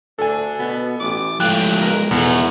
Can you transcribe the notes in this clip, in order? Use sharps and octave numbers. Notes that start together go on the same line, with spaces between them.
D2 D4 A4 G#5
B2 B3
A1 D6
A2 F3 G#3 F5 G5 F#6
B1 A#4
B1 E2 B2 E4 F#5